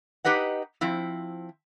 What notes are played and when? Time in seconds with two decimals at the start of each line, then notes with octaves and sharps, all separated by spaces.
0.25 D#4 G4 B4 D#5 F#5
0.81 F3 C4 E4